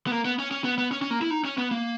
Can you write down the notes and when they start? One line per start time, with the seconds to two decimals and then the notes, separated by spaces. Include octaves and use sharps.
0.07 B3
0.11 A#3
0.25 B3
0.39 C#4
0.51 C#4
0.64 B3
0.78 B3
0.91 C#4
1.02 C#4
1.11 A#3
1.21 E4
1.30 D#4
1.45 C#4
1.58 B3
1.71 A#3